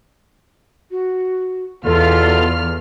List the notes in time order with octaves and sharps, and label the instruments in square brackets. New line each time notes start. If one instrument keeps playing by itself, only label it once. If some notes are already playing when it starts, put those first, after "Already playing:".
[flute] F#4
[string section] E2 F6 [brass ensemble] B2 E3 F4 [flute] A4